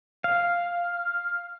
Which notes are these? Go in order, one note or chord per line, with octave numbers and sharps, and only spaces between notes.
F5